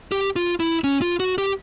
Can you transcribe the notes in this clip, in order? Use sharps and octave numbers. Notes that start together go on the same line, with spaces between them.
G4
F4
E4
C#4
F4
F#4
G4